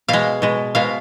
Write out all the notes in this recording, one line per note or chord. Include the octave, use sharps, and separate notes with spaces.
B2 G#3 F5
B2 G#3
B2 G#3 F5